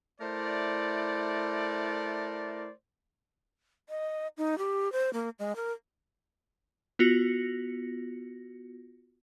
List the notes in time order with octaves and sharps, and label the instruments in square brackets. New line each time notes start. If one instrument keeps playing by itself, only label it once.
[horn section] A3 E4 A#4 C5 D5
[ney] D#5
D#4
G4
C5
A#3
G#3
A#4
[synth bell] B3 F4 F#4 A#6 C#7